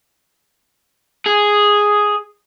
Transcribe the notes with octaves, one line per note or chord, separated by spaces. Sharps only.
G#4